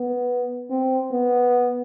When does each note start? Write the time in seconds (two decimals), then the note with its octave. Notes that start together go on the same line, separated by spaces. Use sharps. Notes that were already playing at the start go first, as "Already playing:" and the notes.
Already playing: B3
0.70 C4
1.11 B3